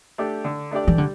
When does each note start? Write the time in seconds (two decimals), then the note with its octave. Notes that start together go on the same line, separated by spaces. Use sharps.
0.18 A3 D4 G4 D5
0.45 D3
0.71 A3 D4 G4 D5
0.87 E3
0.98 D3 G3